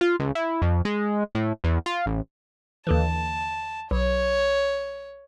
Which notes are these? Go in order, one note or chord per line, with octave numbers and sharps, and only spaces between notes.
F4
C#2
E4
F2
G#3
A2
E2
F4
A1
D#2 D3 E3 A5
B1 C#5